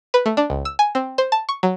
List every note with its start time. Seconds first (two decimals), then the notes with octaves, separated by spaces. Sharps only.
0.14 B4
0.26 A3
0.37 D4
0.50 C#2
0.65 E6
0.79 G#5
0.95 C4
1.18 C5
1.32 A5
1.49 C#6
1.63 F#3